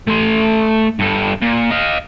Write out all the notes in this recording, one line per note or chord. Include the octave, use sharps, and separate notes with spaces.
A3 C6
G2 A4
A#2
D#5 F5